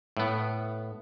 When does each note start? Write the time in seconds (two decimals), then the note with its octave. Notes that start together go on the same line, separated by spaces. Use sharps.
0.17 A2 B3